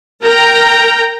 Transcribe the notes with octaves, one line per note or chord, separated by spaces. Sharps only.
A#4 G5 A#5